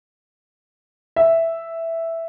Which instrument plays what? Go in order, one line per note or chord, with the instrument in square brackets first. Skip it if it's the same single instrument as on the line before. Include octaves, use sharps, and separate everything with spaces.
[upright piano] E5